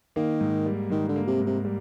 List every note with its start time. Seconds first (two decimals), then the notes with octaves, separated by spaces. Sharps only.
0.16 D#3 A#3
0.41 G#2
0.66 G3
0.90 G#2 D#3
1.09 D3
1.16 A#3
1.28 C3
1.40 G#2
1.46 C3
1.65 G3